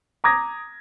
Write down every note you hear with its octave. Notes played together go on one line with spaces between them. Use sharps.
A#5 D6 D#6 G#6 A#6